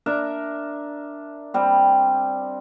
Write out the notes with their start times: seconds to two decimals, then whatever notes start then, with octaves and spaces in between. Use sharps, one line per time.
0.06 D4 A#4 E5
1.54 G3 C4